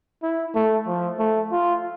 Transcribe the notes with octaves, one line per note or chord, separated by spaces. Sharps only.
E4
A3
F3
A3
F4